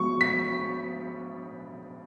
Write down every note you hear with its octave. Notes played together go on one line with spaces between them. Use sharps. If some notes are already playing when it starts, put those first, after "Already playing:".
Already playing: F3 G#3 B3 F#4 C#6
B6